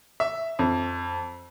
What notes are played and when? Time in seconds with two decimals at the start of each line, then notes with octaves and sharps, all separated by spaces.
0.20 E5
0.59 F2